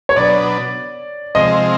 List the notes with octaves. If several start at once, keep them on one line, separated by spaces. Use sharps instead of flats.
C#5
B2 F#3 B3 D4 D5
C3 F3 G#3 C4 D#5